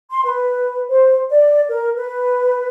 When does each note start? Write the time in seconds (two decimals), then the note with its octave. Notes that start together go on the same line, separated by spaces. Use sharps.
0.10 C6
0.25 B4
0.90 C5
1.30 D5
1.69 A#4
1.96 B4